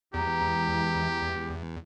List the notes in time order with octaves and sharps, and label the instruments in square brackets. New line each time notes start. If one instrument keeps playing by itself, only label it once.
[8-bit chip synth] E2 [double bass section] E3 G#3 [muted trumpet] G4 [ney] A#5